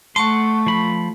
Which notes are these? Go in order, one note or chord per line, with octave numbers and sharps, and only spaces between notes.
A3 F#5 A5 C6 C#6
F3 B5